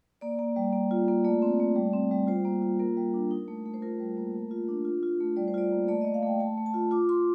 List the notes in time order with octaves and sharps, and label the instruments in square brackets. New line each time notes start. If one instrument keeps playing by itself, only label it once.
[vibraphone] A#3 D5
A#3
G3
A#3
F4
A#3
A3 D5
C4
A3
G3
C4
G3
F4 C5
A#3
F4
A#3 A#4
G3
D4
D#4
A3
A3
C5
F4 A#4
G3
A#3
A3
F4
D4
F4
F4
A3
G3 D5
C5
F4 D5
A#3
A3 D5
A3 D#5
F5
A3 G5
A3 A5
A3
A5
F4
F4 D6
F4 C6